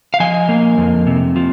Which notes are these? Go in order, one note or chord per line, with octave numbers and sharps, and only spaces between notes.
F5
F3 D#5 G#5
A#3
F2
C3
F3